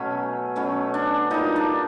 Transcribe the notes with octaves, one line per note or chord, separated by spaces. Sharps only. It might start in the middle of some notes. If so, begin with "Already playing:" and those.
Already playing: B2 F#3 A3 C#4
B2 F#3 A3 C#4
D4
A#2 G3 D#4
D4